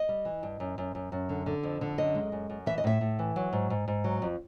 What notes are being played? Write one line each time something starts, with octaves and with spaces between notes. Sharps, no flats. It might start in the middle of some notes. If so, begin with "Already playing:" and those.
Already playing: D#5
G3
E3
G2
F#2
F#2
F#2
F#2
D3
D3
F2
D3
F#2 D#5
G#3
F#2
F#2
E3 E5
D#5
A2 E5
A2
E3
F#3
G#2
G#2
G#2
F#3
F2